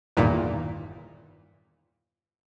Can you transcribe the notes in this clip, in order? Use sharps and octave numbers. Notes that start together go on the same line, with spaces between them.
G1 E2 G2 A#2 D#3